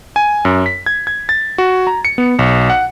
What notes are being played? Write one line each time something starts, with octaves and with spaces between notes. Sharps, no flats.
G#5
F#2
B6
G#6
G#6
A6
F#4
A#5
C#7
B3
B1
F#5